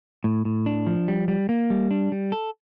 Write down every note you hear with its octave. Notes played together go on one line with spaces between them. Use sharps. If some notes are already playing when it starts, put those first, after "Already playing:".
A2
A2
D4
F3
G3
G3
A#3
G3
D4
G3
A4